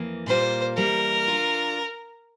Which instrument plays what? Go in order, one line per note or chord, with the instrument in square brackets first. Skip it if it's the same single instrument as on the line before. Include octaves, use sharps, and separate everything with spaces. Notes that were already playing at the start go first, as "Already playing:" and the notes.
Already playing: [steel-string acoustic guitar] F2 E3 A#3
[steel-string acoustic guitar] A#2 G3 A#3 F4 [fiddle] C5
[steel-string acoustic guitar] E3 G3 A#3 [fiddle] A#4
[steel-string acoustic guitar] D4 F4